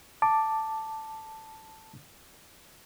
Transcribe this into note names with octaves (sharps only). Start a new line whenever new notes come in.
A5 D6